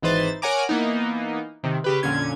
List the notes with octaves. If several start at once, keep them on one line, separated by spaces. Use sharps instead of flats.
G#1 E3 D#4 B4 C5 A6
A#4 C#5 F#5 G#5 A#5 D6
E3 A#3 B3 D#4
C3 D#3
C#3 G4 B4
F2 A#2 D3 C#4 G#6